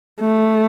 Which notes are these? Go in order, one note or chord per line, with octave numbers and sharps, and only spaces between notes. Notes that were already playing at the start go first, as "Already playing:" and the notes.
A3